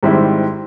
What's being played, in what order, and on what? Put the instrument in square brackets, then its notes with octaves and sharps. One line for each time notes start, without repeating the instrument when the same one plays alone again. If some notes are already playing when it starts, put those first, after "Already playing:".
[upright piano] G#2 D#3 G3 C4 E4